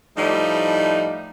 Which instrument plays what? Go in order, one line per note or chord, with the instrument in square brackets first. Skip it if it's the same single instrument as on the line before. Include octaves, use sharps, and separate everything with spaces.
[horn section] A2 F3 G3 D#4